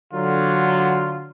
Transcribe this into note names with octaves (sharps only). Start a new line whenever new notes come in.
D3 F#3 F4